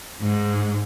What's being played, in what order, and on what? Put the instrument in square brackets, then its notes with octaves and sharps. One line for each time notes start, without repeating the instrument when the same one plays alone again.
[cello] G#2